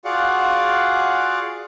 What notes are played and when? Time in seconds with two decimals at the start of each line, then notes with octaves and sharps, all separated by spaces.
0.05 F4 F#4 G#4 D5 F5 F#5